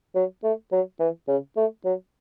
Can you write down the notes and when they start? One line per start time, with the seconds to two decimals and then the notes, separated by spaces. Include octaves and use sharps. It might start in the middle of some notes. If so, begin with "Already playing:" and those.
0.15 F#3
0.44 A3
0.72 F#3
1.00 E3
1.28 C#3
1.57 A3
1.85 F#3